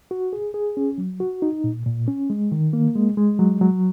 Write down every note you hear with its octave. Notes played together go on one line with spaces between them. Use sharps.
F#4
G#4
G#4
C#4
F#3
F#4
D#4
A#2
A#2
C#4
G#3
D#3
A#3
G#3
G#3
F#3
F#3